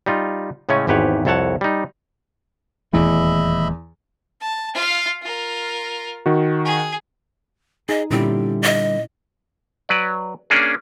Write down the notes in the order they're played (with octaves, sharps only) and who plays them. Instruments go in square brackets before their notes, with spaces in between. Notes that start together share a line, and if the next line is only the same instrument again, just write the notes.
[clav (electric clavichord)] G3 D#4 F4
A2 C#3 G#3 A3 C#4 G#5
G#1 E2 G#2 G4 B4 C#5
C2 F2 A4 C#5 F#5 A5
G3 D#4
[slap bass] D#1 E3 A3 [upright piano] E2 [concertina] D#5 E5 B5
[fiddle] A5
F4 F5
F4 A#4
[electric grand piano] D#3 F#4
[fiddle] G#4
[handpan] D#4 [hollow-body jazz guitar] G#4 [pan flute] D#5
[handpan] A#2 C#4 E4 [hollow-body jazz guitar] D3 G3 G4 [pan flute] C4
[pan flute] D#5
[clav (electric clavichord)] F#3 B4 D5
A#3 C#4 D4 G#4